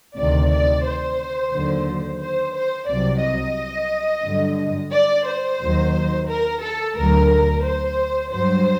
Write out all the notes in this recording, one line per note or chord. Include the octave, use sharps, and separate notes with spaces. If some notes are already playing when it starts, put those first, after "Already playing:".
D2 C3 D#3 D5
D5
C5
D#2 D3 F#3
C5
C5
C2 C3 F#3 D5
D#5
G2 D3 F#3
D5
C5
D#2 D#3 F#3
A#4
A4
D2 D3 F#3 A#4
C5
G2 F#3 C5